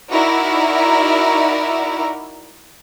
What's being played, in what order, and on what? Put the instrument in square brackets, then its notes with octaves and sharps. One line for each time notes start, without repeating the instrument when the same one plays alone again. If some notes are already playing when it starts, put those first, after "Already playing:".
[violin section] D#4 E4 F#4 A#4 D5 E5